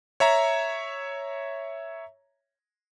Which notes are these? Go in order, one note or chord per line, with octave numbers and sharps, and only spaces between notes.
C#5 E5 A#5